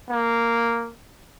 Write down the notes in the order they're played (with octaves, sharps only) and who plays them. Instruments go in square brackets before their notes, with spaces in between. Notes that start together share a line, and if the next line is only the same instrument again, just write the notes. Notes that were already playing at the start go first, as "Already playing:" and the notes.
[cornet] A#3